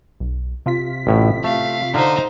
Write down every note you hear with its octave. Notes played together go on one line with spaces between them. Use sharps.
B1
C3 F4 B6
A1 A2
A3 F5
D3 D#4 C5 F5